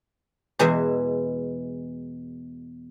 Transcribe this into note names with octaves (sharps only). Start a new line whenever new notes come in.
E2 B2 E3 G#3 E5